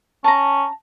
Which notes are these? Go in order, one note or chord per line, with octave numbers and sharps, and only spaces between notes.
C#4 A5 A#5